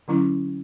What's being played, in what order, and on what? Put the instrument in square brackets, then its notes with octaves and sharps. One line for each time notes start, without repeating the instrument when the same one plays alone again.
[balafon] D3 F#3 C#4 E4